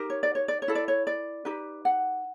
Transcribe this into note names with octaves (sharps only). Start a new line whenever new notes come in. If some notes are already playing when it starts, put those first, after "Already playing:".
Already playing: D#4 G4 A#4
C#5
D5
C#5
D5
C#5
E4 A4
D5
C#5
D5
D#4 G4 B4
F#5